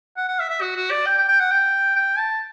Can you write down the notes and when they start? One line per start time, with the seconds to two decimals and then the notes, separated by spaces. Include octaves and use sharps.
0.17 F#5
0.28 F#5
0.39 E5
0.50 E5
0.61 F#4
0.76 F#4
0.91 D5
1.06 G5
1.17 G5
1.28 G5
1.40 F#5
1.51 G5
1.96 G5
2.18 A5